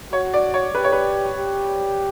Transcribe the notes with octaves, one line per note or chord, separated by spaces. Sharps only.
F#4 C#5
D5
C#5
G4 B4
C#5
B4
G4